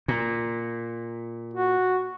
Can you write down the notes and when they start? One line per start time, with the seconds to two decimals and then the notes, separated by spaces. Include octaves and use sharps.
0.08 A#2
1.54 F#4